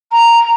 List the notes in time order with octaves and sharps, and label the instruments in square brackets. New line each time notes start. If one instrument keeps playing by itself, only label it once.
[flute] A#5